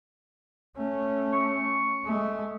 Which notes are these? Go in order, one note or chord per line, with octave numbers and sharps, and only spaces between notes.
A3 C#4
C#6
G#3 A3